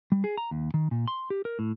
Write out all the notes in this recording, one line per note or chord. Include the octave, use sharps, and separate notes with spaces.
G3
G#4
A#5
D#2
D#3
A#2
C6
G4
A#4
A2